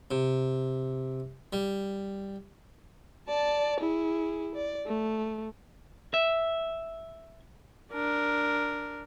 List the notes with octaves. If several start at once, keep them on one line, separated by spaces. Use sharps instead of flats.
C3
G3
D5 A5
E4 G#4
D5
A3
E5
D4 A#4